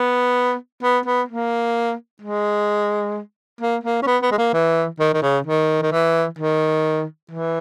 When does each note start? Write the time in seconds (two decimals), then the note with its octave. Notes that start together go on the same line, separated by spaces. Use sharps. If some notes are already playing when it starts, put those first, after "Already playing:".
Already playing: B3
0.83 B3
1.06 B3
1.28 A#3
2.22 G#3
3.61 A#3
3.84 A#3
4.02 C#4
4.07 B3
4.22 B3
4.32 G#3
4.38 A#3
4.54 E3
5.00 D#3
5.14 D#3
5.23 C#3
5.47 D#3
5.82 D#3
5.92 E3
6.39 D#3
7.31 E3